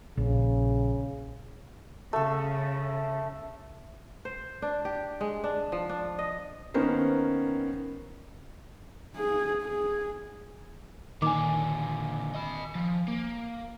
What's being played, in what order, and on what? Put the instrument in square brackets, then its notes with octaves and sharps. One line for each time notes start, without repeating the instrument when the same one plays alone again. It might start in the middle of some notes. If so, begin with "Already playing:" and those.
[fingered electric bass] A#1 [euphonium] C#3
[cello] C#3 [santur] A3 A4
[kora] C5
D4
G4
G#3
D4
F3
D4
D#5
[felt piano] D#3 A#3 B3 C#4 A#4 C5
[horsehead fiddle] G#4
G#4
[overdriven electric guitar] A#2 D3 [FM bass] D#3 [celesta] G#5 D6
[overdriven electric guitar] D#5 B5
F3
A#3